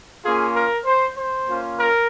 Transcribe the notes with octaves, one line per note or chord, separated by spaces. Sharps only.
A#3 C#4 F4 G#4
A#4
C5
C5
A#3 C#4 F4
A#4